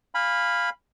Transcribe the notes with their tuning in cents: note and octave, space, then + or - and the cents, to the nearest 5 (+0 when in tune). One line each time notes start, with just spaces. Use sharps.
F5 +0 G#5 -30 B5 +0